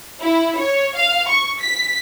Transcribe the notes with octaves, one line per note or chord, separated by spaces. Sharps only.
E4
C#5
F5
C#6
B6